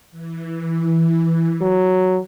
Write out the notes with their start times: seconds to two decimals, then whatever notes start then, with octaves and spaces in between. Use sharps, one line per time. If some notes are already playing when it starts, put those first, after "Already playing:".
0.11 E3
1.61 F#3